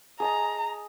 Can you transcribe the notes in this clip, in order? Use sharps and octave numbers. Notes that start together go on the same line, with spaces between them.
G#4 D#5 A5 A#5